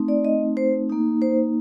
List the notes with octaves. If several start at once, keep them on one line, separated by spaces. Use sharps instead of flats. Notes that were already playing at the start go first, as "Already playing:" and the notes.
Already playing: A3 C4 D#4
D5
D#5
C5
A#3 D#4
C5